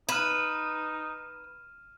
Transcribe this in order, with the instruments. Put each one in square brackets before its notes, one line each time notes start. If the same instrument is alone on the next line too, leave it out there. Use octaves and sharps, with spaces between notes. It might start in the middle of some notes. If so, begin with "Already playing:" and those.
[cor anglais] D#4 [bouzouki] B4 [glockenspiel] F6 D#7 E7